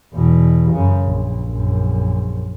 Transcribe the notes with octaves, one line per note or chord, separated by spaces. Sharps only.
E2 B2
F#2 C#3
A#1
A#1 F#2